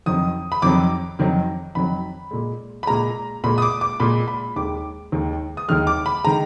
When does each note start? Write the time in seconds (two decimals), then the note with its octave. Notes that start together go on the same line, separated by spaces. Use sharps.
0.06 F2 D#3 F#3 D#6
0.52 B5
0.62 F2 D#3 F#3 D6
1.19 F2 D#3 F#3
1.75 F2 D#3 F#3 B5
2.31 A#2 G#3
2.83 B5
2.87 A#2 G#3 A#5
3.44 A#2 G#3 B5
3.58 D#6
3.62 D6
3.81 D6
4.00 A#2 G#3 B5
4.28 B5
4.56 D#2 D#3 G#3 D6
5.12 D#2 D#3 G#3
5.57 D#6
5.68 D#2 D#3 G#3 F6
5.87 D6
6.06 B5
6.24 D#3 G#3 A#5